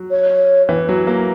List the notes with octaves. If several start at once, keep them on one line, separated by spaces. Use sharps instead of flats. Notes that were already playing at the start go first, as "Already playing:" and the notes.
Already playing: F#3
C#5
E3
F#3
A#3